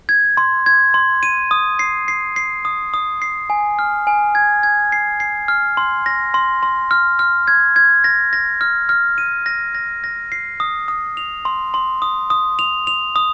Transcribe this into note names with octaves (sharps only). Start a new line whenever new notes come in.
G#6
C6
G#6
C6
D#7
D#6
C7
C7
C7
D#6
D#6
C7
G#5
F6
G#5
G#6
G#6
C7
C7
F6
C6
A#6
C6
C6
F6
F6
G#6
G#6
A#6
A#6
F6
F6
D#7
A#6
A#6
A#6
C7
D#6
D#6
F7
C6
C6
D#6
D#6
F7
F7
D#6